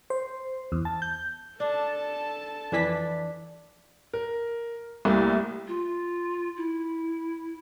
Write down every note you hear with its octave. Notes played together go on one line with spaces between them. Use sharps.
C5
E2
A5
G6
D4 A4 A5
F2 E3 D4 B6
A#4
C2 A3 A#3 E4
F4
E4